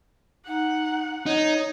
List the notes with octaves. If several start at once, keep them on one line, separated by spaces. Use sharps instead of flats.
D#4 F#5
D#4 C#5